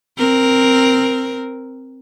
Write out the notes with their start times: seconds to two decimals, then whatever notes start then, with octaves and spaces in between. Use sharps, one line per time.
0.17 C4 A#4